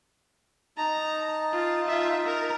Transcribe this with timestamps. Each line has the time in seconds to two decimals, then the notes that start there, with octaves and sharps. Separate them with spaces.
0.78 D#4 A5 A#5
1.53 F4
1.87 F4 E5
2.26 A#4